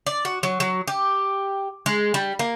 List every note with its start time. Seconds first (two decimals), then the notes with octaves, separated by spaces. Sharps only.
0.07 D5
0.25 F#4
0.43 F#3
0.60 F#3
0.88 G4
1.86 G#3
2.14 G3
2.39 A#3